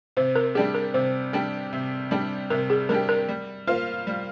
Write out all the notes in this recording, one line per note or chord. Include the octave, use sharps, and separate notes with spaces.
C3 C5
A#4
G3 D4 G4 G#4
A#4
C3 C5
G3 D4 G4
C3
G3 D4 G4
C3 A#4
G#4
G3 D4 G4 A#4
A#4
G3
A#3 F4 C5 F5
G3